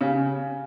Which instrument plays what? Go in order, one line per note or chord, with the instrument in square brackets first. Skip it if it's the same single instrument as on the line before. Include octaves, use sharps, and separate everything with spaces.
[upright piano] C#3 [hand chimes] G4 C#5 F5 G#5